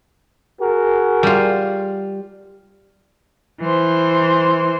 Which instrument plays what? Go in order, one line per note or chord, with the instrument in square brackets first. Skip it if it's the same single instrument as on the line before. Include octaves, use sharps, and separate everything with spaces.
[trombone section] F#4 G#4 A#4
[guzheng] G3 F4
[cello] E3 C5